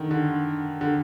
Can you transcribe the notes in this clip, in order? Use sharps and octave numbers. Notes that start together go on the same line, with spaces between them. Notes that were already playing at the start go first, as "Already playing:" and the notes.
Already playing: D3 D#3
D3
D3